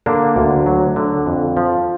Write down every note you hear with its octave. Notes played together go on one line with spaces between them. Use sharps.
D3 A#3 D4
D2
F#3
D3
F2
F3